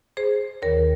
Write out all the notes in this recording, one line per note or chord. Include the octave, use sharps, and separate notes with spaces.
G#4 C5
D#2 D#3 A#4 C#5